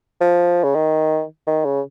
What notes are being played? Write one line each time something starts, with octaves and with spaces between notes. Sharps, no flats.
F3
C#3
D#3
D#3
C#3